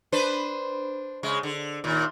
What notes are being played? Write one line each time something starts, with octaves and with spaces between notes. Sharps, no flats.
D4 B4 C5
C#3 G#3
D3
D#2 A#2